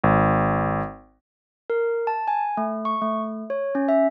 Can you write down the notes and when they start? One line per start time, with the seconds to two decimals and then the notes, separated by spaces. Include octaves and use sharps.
0.04 G#1
1.70 A#4
2.07 A5
2.28 G#5
2.57 A3
2.85 C#6
3.02 A3
3.50 C#5
3.75 C#4
3.88 E5